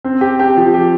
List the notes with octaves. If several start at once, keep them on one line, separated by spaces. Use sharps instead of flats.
C4
G4
G4
F3
G4